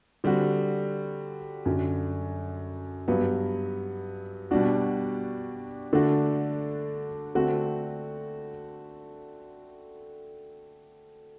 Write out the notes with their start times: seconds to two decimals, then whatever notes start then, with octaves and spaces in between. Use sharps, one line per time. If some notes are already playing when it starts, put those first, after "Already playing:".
0.24 D3 G3 C4 F#4
1.66 F#2 D3 F#3
3.08 G2 F#3 B3
4.51 B2 G3 D4 F#4
5.93 D3 A3 D4 F#4
7.35 D3 A3 C4 F#4